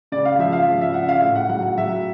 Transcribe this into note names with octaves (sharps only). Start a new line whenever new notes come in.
C#3 D5
F5
F3 E5
F5
F3
E5
C#3 F#5
F5
A2 F5
F#5
F#3 F#5
F#5
F#3 E5